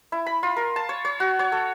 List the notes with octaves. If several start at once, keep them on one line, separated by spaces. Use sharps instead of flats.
E4
B5
F4
A#4
A5
C#5
C#5
F#4
C#5
A4